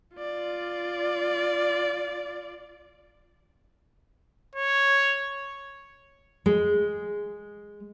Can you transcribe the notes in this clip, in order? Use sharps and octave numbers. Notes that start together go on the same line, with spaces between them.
F4 D5
C#5
G#3